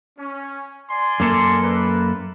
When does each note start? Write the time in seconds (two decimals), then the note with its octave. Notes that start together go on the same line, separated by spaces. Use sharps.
0.17 C#4
0.90 D5 G#5 C6
1.20 F#2 A#3 A4
1.63 A#4 B4